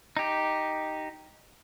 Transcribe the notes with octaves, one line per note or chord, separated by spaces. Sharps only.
D#4 G4